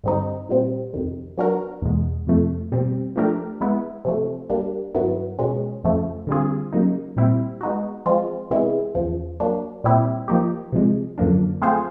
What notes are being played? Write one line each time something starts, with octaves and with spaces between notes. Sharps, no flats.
G2 D3 G3 C4 D#4
A#2 G3 C4
F2 C3 D#3
F#3 B3 D4 F#4 A#4
E2 B2 G#3
F2 C3 F3 A3
B2 G3 C4
F3 A3 D4 G4 A#4
G#3 B3 E4
C3 F3 A3
G3 A#3 D4
G2 D#3 F#3 B3 E4
B2 G#3 C#4
F2 C#3 F3 A3
D3 G3 C4 F4 G#4
C#3 F#3 A#3 D#4
A#2 G3 C4 E4
G#3 B3 D#4 F#4
F3 G#3 C4 F4
C3 E3 G#3 B3 E4
E2 C#3 F3
F#3 A#3 D4
A#2 G3 C4 E4 G4
F3 A#3 D#4 G4
C3 F3 G#3
F#2 D3 F3 A#3 D4
A3 C4 F4 G#4 C5